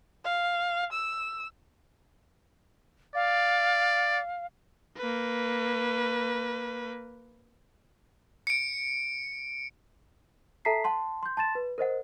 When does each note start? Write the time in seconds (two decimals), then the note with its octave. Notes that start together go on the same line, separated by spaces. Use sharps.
0.24 F5
0.92 E6
3.15 D5 F5
4.97 A#3 B4
8.47 C#7 D7
10.65 A4 E5 A5 A#5 B6 C7
10.84 F#5 A5 C6
11.23 C6 G6
11.37 A5 C6 A6 E7
11.55 B4
11.78 A#4 C5 D#5 F#5